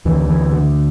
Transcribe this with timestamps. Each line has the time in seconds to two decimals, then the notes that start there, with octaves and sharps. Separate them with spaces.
0.05 D2 D3 E3
0.29 E3
0.53 D3